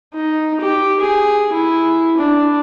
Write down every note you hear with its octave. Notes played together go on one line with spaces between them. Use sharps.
D#4
G4
G#4
E4
D4